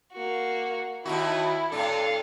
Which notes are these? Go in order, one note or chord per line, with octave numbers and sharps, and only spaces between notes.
A#3 F#4
D#2 D#4 E4 F#4
A2 D4 A4 F5